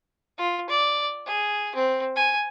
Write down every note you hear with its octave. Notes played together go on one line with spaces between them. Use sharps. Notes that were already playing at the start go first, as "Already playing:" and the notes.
F4
D5
G#4
C4
G#5